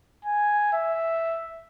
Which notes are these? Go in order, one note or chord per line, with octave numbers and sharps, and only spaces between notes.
G#5
E5